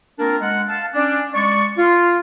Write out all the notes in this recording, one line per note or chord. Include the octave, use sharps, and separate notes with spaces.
A#3 C4 D4 F4 A#4
G#3 F#5
F5 A5
C#4 D4
G#3 D5 C#6
F4